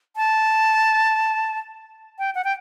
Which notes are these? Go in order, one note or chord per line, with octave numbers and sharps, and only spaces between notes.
A5
G5
F#5
G5